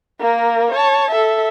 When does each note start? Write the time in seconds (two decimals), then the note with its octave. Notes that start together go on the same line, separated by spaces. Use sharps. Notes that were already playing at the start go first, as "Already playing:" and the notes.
0.19 A#3 A#4
0.71 C#5 A5
1.11 A4 E5